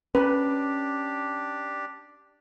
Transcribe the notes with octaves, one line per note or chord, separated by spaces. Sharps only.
C#4 D4 G4 B4